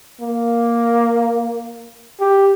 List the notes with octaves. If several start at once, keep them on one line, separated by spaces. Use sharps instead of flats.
A#3
G4